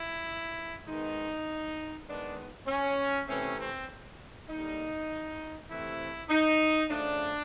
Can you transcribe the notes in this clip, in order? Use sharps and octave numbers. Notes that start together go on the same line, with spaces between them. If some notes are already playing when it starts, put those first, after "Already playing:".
Already playing: E4
D#3 G#3 B3 D#4
D#3 G#3 B3 D4
C#4
C3 E3 A3 C4 C#4
C4
D3 G3 A#3 D#4
C3 E3 A3 C4 E4
D#4
C#3 F3 A3 D4